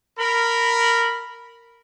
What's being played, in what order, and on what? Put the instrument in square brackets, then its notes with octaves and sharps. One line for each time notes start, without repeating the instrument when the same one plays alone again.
[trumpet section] A#4 B5